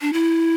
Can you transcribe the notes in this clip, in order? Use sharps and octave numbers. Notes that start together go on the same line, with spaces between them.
D4
E4